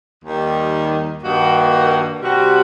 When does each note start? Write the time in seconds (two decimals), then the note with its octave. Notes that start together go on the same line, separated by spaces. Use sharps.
0.24 D#2 D#3 G3
1.23 G2 D#3 G3 A#3 F#4
2.22 C3 G3 C4 F#4